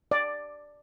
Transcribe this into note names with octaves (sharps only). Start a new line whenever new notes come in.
D5